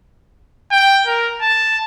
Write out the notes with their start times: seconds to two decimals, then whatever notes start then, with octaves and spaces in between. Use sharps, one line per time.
0.71 G5
1.06 A#4
1.42 A5